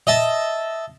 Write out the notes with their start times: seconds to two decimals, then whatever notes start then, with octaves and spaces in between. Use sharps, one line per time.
0.07 D#5 E5 A5